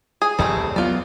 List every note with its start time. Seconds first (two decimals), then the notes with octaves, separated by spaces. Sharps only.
0.22 G#4
0.39 A1 E2 G3 A3 C4
0.76 F#3 B3 F4 D5